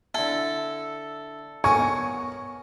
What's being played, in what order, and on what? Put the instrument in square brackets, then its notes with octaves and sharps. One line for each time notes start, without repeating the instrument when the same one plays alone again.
[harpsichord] D3 E4 [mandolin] A4
[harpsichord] B3 A#4 C#5 [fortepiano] G#5 [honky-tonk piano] C#6